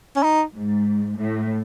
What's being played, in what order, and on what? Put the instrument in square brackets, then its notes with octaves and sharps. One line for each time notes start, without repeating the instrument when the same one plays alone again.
[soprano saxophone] C#4
D#4
[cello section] G#2
A2